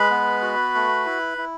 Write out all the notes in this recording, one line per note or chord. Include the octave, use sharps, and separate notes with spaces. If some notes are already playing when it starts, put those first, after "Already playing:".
Already playing: G#3 B4 B5
B3
F#4
A3
E4
E4